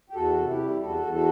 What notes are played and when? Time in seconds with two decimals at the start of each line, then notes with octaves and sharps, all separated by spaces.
0.09 G4
0.14 E2 F#4 A4
0.37 C3
0.48 E4 G4
0.59 G3
0.81 E2 F#4 A4
1.02 E2
1.13 F#4 A4